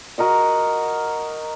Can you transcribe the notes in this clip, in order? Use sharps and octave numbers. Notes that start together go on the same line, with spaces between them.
F#4 A#4 D#5 F#5